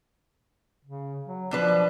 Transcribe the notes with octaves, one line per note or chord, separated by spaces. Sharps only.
C#3
F#3
B2 F3 D4 B4